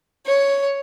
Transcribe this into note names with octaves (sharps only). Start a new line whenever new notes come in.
C#5